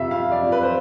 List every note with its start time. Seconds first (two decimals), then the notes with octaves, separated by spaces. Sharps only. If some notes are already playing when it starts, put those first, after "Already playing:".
Already playing: F2 C3 E5 F5
0.11 F2 F5
0.32 D5
0.42 F2
0.52 B4
0.63 C5